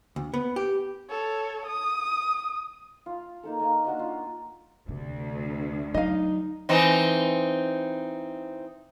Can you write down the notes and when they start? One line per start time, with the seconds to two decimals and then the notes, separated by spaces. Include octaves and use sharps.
0.16 D2
0.34 B3
0.56 G4
1.10 A4 C#5
1.66 D#6
3.06 F4
3.43 A#3 D#4 A4
3.60 A#3 D#5 F5
3.85 D4 F#4 D#5
3.99 F4
4.89 D2 C3
5.94 F#3 D#4 D#5 F5
6.69 E3 C4 D#4